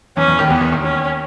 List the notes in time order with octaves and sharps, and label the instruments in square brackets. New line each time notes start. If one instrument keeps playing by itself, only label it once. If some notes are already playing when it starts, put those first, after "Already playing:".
[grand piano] E2 E3 [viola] C#4
[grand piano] E2 E3
D#2 D#3
[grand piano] E2 E3 [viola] B3
[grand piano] E2 E3
D#2 D#3
[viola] C#4